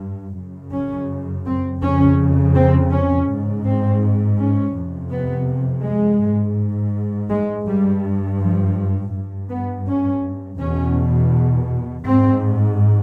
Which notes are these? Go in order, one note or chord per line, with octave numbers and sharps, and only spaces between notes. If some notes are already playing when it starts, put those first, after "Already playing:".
Already playing: G2
F#2 C#3
C#4
C4
F2 C#3 C#4
C4
C#4
G#2
C4
C#4
F2 C3
B3
G#3
G#2
G#3
G2 G3
F3
G2
B3
C#4
E2 B2 C#4
G#2 C4